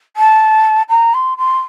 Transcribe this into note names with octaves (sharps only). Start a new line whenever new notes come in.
A5
A#5
C6
C6